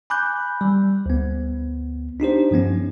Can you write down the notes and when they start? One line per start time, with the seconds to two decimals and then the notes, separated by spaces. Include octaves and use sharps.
0.10 G#5 B5 D6 F#6 G6
0.61 G3
1.06 D2 B3
2.20 D4 D#4 G4 C5
2.51 G2 F3 B3 C#4